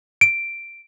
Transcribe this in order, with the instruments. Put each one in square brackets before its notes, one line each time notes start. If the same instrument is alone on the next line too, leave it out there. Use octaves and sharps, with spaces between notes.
[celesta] D7